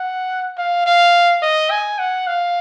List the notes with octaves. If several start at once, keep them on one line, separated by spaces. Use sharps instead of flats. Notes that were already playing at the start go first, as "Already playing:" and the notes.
Already playing: F#5
F5
F5
D#5
G#5
F#5
F5